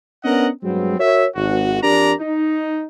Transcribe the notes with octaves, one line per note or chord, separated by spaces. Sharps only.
B3 C#4 D4 A#4 D#5 F#5
G2 F#3 G#3 B3 C4
F#4 A#4 C#5 E5
G#1 F#4
F2 D4 G4 A#4 D5 A#5
D#4